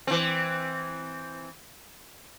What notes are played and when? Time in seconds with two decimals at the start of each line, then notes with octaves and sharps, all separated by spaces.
0.07 E3 C4